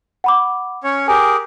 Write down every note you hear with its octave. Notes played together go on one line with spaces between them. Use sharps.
F#5 B5 D6
C#4 C#5
G4 G#4 A#4 G#5